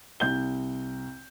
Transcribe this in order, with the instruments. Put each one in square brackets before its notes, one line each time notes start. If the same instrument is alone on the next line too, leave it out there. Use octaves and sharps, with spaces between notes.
[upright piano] C2 G6 G7